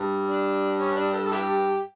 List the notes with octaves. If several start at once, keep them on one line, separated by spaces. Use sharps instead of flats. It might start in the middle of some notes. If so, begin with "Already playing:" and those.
Already playing: G2
D4
C#4
D4
A4
A4
E4 G4